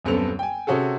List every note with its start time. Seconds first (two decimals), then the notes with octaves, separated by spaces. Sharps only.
0.05 D#1 F#2 B3 C4 A4 F7
0.39 G5 G#5
0.67 C3 C#4 F#4 G#4 A4